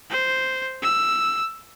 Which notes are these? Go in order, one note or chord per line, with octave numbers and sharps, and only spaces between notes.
C5
E6